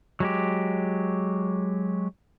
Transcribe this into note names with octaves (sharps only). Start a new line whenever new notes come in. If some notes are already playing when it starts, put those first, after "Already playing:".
F#3 G#3 G4